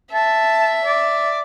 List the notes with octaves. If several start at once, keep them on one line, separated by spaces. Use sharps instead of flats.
E5 A5
D5